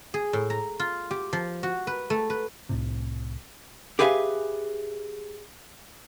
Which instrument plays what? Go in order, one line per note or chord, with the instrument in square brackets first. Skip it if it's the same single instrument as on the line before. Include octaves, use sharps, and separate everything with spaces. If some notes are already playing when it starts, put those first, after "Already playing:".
[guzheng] G#4
A2
A#5
F4
G4
F3
F#4
B4
A3
B4
[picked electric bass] C2 A2 C3
[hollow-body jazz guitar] G4 G#4 B4 E5 F5 G#5